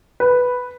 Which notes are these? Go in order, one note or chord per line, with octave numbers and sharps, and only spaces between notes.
B4